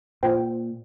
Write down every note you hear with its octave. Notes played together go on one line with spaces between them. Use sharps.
A#2 F4 C5 G5